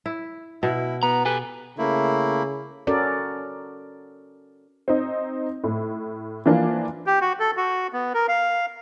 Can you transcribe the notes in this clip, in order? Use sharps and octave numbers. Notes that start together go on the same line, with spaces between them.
E4
B2 E4
B3 A#5
G4 A4 B4 G#5
C#3 A3 A#3 E4
C#4 F#4 A4 A#4 D5
C4 D#4
A2
E3 F3 A#3 D4 F4
G4
F#4
A4
F#4
B3
A#4
F5